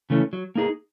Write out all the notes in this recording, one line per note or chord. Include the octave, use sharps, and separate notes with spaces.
C#3 E3 A3 C#4
F#3
A#3 D#4 G#4